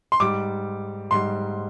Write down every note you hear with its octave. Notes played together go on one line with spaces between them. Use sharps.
C6
G#2 G3 D6
G#2 G3 C6